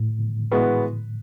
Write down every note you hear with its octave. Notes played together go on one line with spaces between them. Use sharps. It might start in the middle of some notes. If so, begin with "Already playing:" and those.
Already playing: A2
E3 G#3 B3 F#4 B4